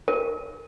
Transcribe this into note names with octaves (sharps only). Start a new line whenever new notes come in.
A#4